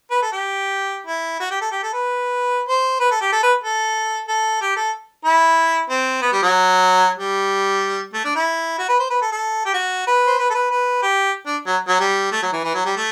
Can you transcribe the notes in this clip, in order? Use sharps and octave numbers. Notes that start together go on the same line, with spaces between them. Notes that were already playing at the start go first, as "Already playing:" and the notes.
B4
A4
G4
E4
F#4
G4
A4
G4
A4
B4
C5
B4
A4
G4
A4
B4
A4
A4
G4
A4
E4
C4
B3
G3
F#3
G3
A3
D4
E4
F#4
B4
C5
B4
A4
A4
G4
F#4
B4
C5
B4
A4
B4
B4
G4
D4
F#3
F#3
G3
A3
F#3
E3
E3
F#3
G3
A3